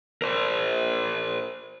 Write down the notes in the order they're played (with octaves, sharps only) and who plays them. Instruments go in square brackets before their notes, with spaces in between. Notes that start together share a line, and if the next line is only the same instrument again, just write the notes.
[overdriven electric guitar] A#4 C5